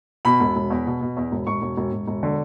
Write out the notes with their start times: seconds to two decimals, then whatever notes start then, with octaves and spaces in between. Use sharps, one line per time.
0.25 B2 B5
0.40 E1
0.56 E1
0.70 E2
0.86 B2
1.01 B2
1.17 E2
1.32 E1
1.47 E1 C#6
1.62 E1
1.77 E1
1.92 E1
2.08 E1
2.23 D3